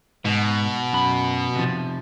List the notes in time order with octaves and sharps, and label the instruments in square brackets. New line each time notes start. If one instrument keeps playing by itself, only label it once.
[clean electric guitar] G#2 [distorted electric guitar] B2
[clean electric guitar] F#2 B5
C3 F3